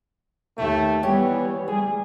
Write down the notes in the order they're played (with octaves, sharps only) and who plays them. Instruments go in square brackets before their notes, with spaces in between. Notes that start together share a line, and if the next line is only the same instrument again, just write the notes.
[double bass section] D#2 [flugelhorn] A3 [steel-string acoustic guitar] G5
[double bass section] E3 G3 B3 [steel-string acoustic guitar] G4 [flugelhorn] C#5
[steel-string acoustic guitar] D2 [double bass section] G3 [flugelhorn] G#4